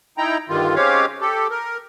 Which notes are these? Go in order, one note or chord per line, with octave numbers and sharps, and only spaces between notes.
D#4 E4 G5 A#5
G2 D3 D#3 G3 F4
G#3 C4 C#4 G4 C#5 F5
G4 A4
A#4